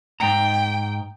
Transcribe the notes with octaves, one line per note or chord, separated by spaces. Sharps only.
G#2 G5 A#5